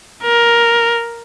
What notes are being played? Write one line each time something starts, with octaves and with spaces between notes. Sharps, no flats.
A#4